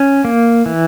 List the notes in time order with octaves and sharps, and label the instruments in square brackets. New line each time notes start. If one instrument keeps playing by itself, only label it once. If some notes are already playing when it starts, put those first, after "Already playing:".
Already playing: [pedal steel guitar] C#4
A#3
E3